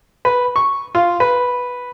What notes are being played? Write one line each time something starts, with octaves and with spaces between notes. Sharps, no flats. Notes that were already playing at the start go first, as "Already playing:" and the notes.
B4
C#6
F4
B4